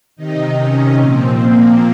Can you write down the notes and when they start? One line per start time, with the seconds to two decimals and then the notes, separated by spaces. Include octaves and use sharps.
0.16 C3 D#3 D#4
0.57 C#4
0.98 A#2 F3 C4
1.39 A#3